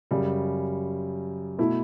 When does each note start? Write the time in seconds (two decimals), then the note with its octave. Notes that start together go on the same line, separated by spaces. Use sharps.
0.11 F#2 C#3 G3
1.59 B2 A3 E4